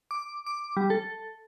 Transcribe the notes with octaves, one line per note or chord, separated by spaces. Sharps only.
D6
D6
G3
A4